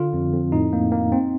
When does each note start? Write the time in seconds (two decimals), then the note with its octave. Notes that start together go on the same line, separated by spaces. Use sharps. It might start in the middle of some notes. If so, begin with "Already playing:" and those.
Already playing: D3 F4
0.13 F2
0.33 F2
0.52 A2 D#4
0.73 A#3
0.92 A#3
1.12 C4